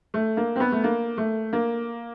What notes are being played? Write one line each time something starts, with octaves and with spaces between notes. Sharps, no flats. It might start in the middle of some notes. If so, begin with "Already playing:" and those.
A3
A#3
C4
B3
A3
A#3
A3
A#3